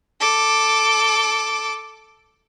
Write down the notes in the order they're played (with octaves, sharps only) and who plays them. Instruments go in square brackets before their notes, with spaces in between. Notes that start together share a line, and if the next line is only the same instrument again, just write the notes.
[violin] A4 D6